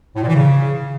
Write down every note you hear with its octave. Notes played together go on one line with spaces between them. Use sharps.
A2
A#2
E3
C#3